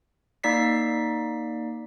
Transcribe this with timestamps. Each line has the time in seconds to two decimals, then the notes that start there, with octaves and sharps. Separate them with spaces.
0.43 A#3 D#4 D5 B6 C7